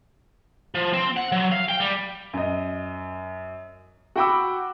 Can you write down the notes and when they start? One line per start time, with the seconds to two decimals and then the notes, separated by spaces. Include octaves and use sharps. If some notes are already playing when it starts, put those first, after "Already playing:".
0.75 F3
0.93 C4
1.17 F#5
1.32 F#3
1.52 F5
1.69 G5
1.80 G3
2.33 F#2 D#5
4.16 F#4 F#5 G5 B5 D6 E6